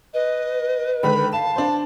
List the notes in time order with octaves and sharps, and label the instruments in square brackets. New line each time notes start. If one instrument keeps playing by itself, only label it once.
[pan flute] B4 [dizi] D#5
[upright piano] D3 D#3 G#3 [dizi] B5
[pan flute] F5 [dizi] A5 [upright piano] E7
[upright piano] D4 C5